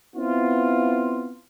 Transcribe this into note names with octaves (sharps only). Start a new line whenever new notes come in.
B3 C4 E4 F4